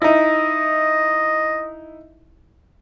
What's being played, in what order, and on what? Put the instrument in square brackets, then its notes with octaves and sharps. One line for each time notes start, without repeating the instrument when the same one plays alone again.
[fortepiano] D#4 E4 [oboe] D#5